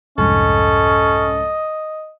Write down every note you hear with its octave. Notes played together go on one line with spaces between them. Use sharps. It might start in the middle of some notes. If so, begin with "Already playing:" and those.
C2 F2 G#2 C#4 A4 D#5